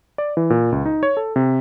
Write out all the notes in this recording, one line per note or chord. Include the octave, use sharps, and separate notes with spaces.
D5
E3
A#2
C#2
D#4
C#5
A4
C3